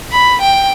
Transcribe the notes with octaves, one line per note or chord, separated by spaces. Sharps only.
B5
G5